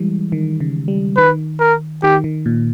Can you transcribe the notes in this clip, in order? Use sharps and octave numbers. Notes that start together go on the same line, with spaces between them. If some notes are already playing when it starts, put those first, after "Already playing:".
Already playing: E3 G3 G#3
D#3
C#3
G3
D#3 B4
A#4
D#3 G4
D#3
A#2